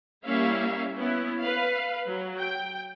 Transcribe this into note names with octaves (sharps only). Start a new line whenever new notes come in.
G3 A#3 C#4 E4 E5 F5
B3 C#4 E4
B4 F5
F#3
G5